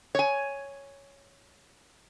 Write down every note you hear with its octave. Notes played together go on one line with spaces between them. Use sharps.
C#5 G#5